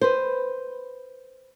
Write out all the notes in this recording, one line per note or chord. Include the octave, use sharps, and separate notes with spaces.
B4 C5